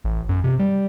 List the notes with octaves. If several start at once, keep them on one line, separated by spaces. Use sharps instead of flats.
A1
F#2
C3
G3